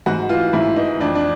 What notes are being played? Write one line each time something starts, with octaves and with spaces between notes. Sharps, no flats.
G#2 F#4
E3 F4
G#2 E4
E3 D#4
F2 D4
D4